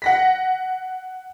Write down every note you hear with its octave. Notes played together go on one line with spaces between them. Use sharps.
F#5 A#6 B6